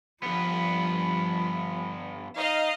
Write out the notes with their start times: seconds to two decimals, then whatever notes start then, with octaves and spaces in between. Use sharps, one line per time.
0.23 G2 F3 B3 B5
2.37 D#4 D#5 F5